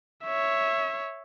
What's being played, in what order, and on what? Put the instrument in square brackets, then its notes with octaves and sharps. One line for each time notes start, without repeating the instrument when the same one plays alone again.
[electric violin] C#5 E5